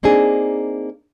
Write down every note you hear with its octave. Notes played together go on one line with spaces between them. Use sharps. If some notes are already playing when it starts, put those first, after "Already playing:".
A#3 C4 D4 D#4 G#4